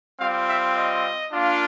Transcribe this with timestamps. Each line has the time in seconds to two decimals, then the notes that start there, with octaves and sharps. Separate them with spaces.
0.20 G3 C4 F4 F5
0.48 E5
0.76 D#5
1.33 A#3 D4 F4